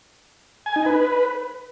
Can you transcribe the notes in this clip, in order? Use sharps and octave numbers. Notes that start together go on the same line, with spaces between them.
G#5
D#4
B4